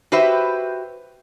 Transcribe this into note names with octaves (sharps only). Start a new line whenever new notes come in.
F#4 G4 B4 C5 E5